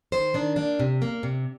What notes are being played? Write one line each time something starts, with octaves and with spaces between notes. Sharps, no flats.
D#3 C5
D#3 D4
A#3 D4
C3
A#3
C3